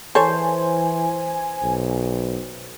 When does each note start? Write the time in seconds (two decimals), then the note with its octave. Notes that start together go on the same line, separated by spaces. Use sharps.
0.15 E3 A4 C5 C#5 G#5
1.63 B1